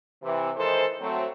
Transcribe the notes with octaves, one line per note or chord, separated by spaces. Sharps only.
C3 E3
D#3 E3 G#3 A4 C5
F#3 A3 C4